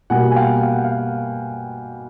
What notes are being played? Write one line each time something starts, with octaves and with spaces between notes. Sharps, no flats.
B2 G3 A#3 F#5 G#5
G#5
F5 G5
F5
F#5
F5